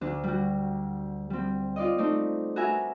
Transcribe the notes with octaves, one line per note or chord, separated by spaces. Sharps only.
D2 D4
G3 F#4
G3 C4
F4 D5 D#5
A3 C4 D#4 D5
D4 F#4 A#4 B4 E5 G#5